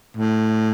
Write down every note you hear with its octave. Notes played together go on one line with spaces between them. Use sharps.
A2